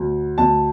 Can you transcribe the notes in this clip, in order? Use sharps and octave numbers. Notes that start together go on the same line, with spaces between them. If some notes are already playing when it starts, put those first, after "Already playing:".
Already playing: D2
D2 A5